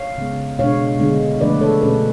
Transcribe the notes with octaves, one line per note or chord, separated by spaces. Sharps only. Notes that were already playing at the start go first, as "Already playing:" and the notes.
Already playing: C#5 F5
C#3 G#3 B3
B2 G#3 D4 C#5 F5
D3 G#3 B3 D4
D3 F3 A3 D4 B4 D5
A4 C#5
B2 F#3 A3 C#4 G#4 B4